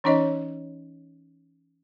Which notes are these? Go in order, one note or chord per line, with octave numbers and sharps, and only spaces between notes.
E3 C#4 D#4 C#5 D#5